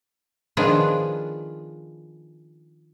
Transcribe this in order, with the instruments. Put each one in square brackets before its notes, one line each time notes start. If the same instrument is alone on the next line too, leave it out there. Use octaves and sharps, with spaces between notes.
[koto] D#3 F3 B3 D4 F4 G#4